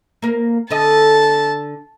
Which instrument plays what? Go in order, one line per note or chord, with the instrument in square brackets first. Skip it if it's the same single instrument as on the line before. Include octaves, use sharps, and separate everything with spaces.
[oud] A#3 A#4
[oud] D3 A4 D#5 [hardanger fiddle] A5